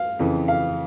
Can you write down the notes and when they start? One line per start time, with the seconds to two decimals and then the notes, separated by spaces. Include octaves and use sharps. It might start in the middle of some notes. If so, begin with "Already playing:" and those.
Already playing: F5
0.19 F2 C#3 E3
0.48 F5